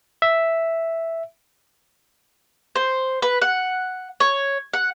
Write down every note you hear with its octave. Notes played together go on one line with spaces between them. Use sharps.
E5
C5
B4
F#5
C#5
F#5